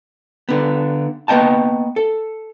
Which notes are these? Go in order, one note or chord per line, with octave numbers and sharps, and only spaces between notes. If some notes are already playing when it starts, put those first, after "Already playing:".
D3 B3
A#3 B3 D#5 G5 A5
A4